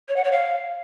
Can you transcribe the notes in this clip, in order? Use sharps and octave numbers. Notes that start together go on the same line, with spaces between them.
C#5
F#5
C#5
F5